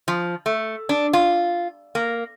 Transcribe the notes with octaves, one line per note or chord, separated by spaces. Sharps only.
F3
A3
D4
F4
A#3